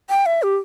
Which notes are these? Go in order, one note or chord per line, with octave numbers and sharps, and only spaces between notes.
G5
E5
G4